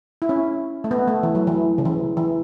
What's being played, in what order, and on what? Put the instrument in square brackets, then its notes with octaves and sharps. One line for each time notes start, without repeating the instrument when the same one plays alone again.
[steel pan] E4
C#4
A3
B3
A3
E3
F#3
E3
C#3
E3
E3